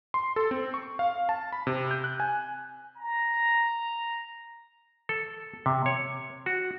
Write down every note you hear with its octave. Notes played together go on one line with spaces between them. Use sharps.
C6
A4
C4
C#6
F5
A5
B5
C3
G6
F#6
G#5
A#5
A4
C3
C#5
F#4